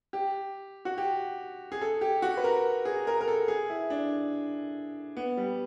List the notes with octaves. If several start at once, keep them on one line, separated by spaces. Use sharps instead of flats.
G4
F#4
G4
G#4
A4
G4
F#4
B4
A#4
G#4
A#4
A#4
A4
G#4
E4
D4
B3
G3